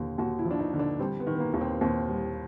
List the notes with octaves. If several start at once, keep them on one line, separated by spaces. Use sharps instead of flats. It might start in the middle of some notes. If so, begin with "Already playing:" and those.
Already playing: D#2 D3
D#2 F#4
E4
F3
D4
D#4
D3
D4
G3 C4
B3
D#3
B3
A#3
D#2
C4
D#2 C4
G3